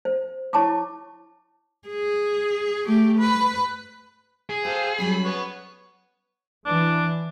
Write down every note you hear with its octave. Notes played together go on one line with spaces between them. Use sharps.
C5
E4 C#5 A5 C#6 D6
G#4
A3 G4
B4
G#4
G4 A4 C5 F5
F#3 G3 C#4 B5
B3 B4 C#5
E3 D4